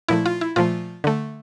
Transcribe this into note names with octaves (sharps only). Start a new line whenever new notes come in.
A#2 F3 A3 E4
F4
E4
A#2 F3 A3 F4
D3 A3